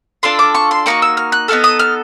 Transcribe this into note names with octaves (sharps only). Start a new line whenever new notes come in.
D4 F4 A4 C6
D6
C#6
C6
A#3 D#4 F#4 C#6
E6
F6
F#6
B3 D#4 F#4 A4 F6
D#6
F6